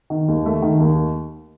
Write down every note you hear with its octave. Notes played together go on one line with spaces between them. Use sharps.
D#3
D#2
A3
D#3
D#2